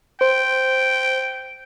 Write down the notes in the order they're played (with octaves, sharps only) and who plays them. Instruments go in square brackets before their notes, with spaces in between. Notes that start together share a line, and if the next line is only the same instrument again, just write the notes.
[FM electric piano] C5 [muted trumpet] G5